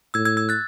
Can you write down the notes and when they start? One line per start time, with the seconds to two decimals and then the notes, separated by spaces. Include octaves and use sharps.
0.14 A2 E6 G#6
0.25 E6 G#6
0.37 E6 G#6
0.49 F#6 A6